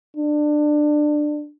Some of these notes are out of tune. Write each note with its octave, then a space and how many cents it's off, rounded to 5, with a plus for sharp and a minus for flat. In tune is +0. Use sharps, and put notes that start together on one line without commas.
D4 +20